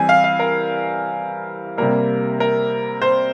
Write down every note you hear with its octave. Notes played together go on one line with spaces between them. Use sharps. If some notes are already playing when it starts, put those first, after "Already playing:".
Already playing: E3 G3 C4 G#5
F5
F5
A#4
C3 G3 A#3 A#4
A#4
C5